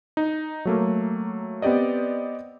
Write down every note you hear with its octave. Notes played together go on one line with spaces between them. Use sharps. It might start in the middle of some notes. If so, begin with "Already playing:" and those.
D#4
F#3 A3 A#3
B3 C4 G4 D5 D#5